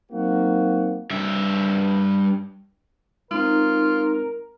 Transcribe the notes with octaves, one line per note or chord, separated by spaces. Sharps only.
F#3 A#3 C4 D#4 F#4
G2 E5
G#3 C4 D#4 F4 A#4